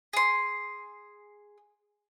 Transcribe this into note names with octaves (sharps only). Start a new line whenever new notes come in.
G#4 C6